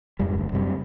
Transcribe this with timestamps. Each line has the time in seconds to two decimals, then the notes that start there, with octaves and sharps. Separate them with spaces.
0.19 F1 F2 G#2 G3
0.35 F#1 D2
0.52 F#2 C3 G3